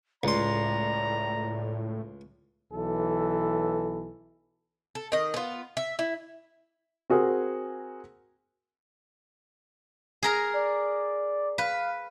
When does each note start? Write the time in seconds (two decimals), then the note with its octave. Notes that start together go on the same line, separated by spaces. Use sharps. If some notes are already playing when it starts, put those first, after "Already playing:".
0.23 C#2 A2 D5 A#5 C6
2.72 B1 E3 A4
4.95 A4
5.12 D#3 D#5
5.34 B3 F4
5.77 E5
5.99 E4
7.10 C4 F#4 G#4 A#4
10.23 G#4 A#4 A#5
10.54 D5
11.58 B4 F5